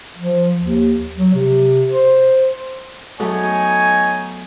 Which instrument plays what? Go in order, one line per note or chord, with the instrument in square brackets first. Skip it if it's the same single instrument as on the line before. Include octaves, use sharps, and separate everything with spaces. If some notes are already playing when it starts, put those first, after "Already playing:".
[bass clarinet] F3
D#2
F#3
C3
C5
[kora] F#3 A3 B3 [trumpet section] D#4 C#5 [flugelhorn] G#5